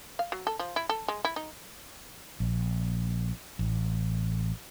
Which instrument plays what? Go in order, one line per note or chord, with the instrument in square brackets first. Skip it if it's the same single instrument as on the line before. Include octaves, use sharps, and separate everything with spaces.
[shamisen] F5
F#3
A4
F3
E4
A4
G#3
E4
D#4
[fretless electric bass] A#1
A1